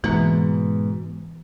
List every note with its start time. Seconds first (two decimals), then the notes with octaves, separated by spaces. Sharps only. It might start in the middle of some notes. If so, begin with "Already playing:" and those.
0.04 G#2 B2 E3 A#3